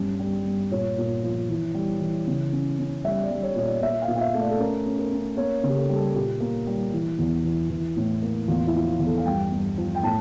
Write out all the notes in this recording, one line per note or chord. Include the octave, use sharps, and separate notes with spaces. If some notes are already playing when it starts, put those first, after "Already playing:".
Already playing: G2 C#4
G3
G2
A#2 C#5
A#2
F3
E3
G3
E3
C#3
C#4
C#4
G3 E5
D5
G3
C#5
A#2 C#5
D5
A#2 E5
F5
A#2
F5
E5
A3
D5
A4
C#4 A#4
C#4
A#4
C#4
A#3 C#5
C#3
G4
A4
G3
A4
A#2 G4
A#3
G3
E3
E2
E3
E3
A2
A#3
E2 F4
E4
F3
F4
E2
A4
F5
G2 G5
G2
F3
G5
A2 A5